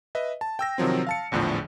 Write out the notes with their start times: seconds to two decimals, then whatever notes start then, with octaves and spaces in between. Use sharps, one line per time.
0.15 B4 D#5 E5
0.41 A5
0.59 G5 E6 A#6
0.78 C3 D#3 F3 F#3 C4
1.07 F5 A5 C#7
1.32 A#1 E2 A2 D3 F3